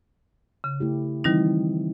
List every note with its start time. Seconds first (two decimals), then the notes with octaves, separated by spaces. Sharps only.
0.64 C#3
0.80 A3 E4 G4
1.24 D#3 E3 G3 C4 D#4